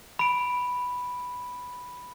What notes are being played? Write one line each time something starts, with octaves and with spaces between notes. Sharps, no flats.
B5 D7